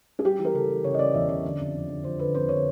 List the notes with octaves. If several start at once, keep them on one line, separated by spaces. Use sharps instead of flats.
G#4
G3 G4
E3
A#4
C#3 A4
E3
C#3 C#5
D#5
C#3 D5
E2 E5
C#3 D5
D3
F2
F3
D3
F3 C5
D3 B4
F2 C5
D3 C#5